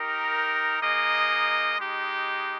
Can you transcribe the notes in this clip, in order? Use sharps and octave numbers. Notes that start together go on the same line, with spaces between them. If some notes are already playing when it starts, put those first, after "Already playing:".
Already playing: D#4 G4 A#4
A#3 D#4 G#4 D#5
G#3 D#4 G4